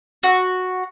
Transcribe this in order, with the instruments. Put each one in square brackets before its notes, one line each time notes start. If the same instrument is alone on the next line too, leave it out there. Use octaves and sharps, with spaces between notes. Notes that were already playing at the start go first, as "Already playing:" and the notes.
[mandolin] F#4